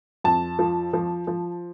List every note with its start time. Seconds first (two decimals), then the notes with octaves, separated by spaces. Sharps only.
0.24 F2 A5
0.59 F3
0.93 F3
1.27 F3